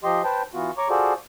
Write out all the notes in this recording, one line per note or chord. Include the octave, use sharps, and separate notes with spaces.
F3 G4 D#5 C6
B4 C5 G5 A5
E3 B3 F4 F#4
C#5 A#5 C#6 D6
F4 F#4 G#4 A4 C5 D5